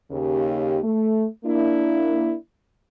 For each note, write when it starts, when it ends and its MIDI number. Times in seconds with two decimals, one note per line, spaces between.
0.10 0.79 39
0.10 0.79 49
0.10 0.79 67
0.83 1.25 57
1.45 2.33 58
1.45 2.33 62
1.45 2.33 64